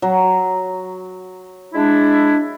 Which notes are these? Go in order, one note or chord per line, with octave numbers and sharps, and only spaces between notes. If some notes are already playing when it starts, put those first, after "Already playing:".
F#3
G#3 D4 E4